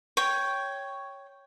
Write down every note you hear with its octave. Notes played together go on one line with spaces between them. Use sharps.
C#5 G5